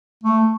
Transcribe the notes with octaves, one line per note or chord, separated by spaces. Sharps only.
A3